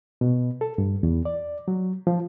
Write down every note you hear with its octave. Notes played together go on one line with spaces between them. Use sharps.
B2
A4
G2
E2
D5
F#3
F3